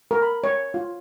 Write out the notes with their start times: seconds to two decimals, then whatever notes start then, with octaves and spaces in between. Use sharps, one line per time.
0.11 A#4
0.22 B5
0.44 C#5
0.74 F4